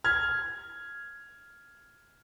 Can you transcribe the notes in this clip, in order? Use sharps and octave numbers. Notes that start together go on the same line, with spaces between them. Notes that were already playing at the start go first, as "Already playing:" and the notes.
F6 G#6